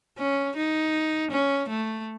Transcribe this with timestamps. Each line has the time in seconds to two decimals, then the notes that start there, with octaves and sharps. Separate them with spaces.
0.18 C#4
0.57 D#4
1.31 C#4
1.69 A3